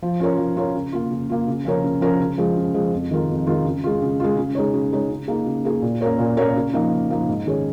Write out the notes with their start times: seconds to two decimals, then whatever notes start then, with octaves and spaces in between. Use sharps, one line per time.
0.02 F3
0.20 C#4 F4 A#4 C#5
0.38 F3
0.57 C#4 F4 A#4 C#5
0.75 C#3
0.92 A#3 F4
1.11 C#3
1.29 A#3 F4
1.48 C#3
1.65 F3 C#4 A#4 C#5
1.84 C#3
2.01 F3 C#4 A#4 C#5
2.20 C#3
2.38 F3 G#3
2.56 C#3
2.74 F3 G#3
2.93 F2
3.11 D#3 G#3 F4 A#4
3.29 F2
3.47 D#3 G#3 F4 A#4
3.64 C#3
3.84 G#3 F4
4.02 C#3
4.20 G#3 F4
4.37 C#3
4.55 G#3 D#4 C#5
4.73 C#3
4.92 G#3 D#4 C#5
5.10 C#3
5.28 A#3 D#4 G#4
5.46 C#3
5.65 A#3 D#4 G#4
5.82 A#2
6.01 A#3 C#4 A#4 C#5
6.19 A#2
6.37 A#3 C#4 A#4 C#5
6.56 C#3
6.73 F3 A#3 D#4
6.91 C#3
7.10 F3 A#3 D#4
7.28 G#2
7.46 D#3 C#4 G#4 C#5